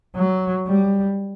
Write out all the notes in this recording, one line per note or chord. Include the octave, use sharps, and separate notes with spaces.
F#3
G3